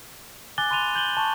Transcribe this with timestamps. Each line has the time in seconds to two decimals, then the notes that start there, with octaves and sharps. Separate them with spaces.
0.58 G#5 D6 F#6 A6 G7
0.71 B5 C6 F#6 D#7 F7 G7
0.95 G6 F#7 G7
1.17 A5 C#6